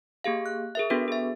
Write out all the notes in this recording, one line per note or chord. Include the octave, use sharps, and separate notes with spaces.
A#3 G4 G#4 F5
F#6
G#4 A#4 E5
B3 D4 F#4 G#4 A4 B4
G#4 E5